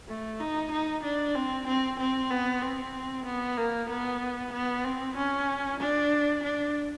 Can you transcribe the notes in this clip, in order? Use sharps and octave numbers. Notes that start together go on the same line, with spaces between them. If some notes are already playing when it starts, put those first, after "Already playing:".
A3
D#4
D#4
D4
C4
C4
C4
B3
C4
B3
A#3
B3
B3
C4
C#4
D4
D4